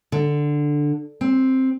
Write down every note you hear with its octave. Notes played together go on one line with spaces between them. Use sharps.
D3
C4